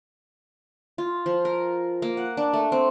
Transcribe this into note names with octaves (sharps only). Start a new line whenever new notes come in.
F4
F3
A#4
A#3
F#5
D4
A3
C4